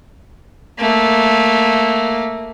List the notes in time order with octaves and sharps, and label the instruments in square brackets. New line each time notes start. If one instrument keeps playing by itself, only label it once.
[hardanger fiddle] A3 A#3